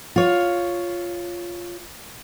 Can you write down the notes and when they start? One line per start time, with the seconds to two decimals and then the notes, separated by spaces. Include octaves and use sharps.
0.16 F4 C#5